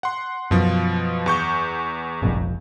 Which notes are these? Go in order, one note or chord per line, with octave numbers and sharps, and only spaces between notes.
F#5 C6
F#2 B2 F3
E2 C#6 G6
F1 A#1 F2